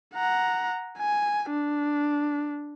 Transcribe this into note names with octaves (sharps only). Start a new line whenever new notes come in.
F#5 A#5
G#5
D4